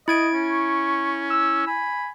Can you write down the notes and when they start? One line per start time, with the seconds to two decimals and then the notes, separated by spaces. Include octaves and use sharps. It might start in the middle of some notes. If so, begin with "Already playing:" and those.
0.08 E4 D#5 G#6 D7
0.34 C#4
0.49 C#6
1.30 E6
1.67 G#5 B5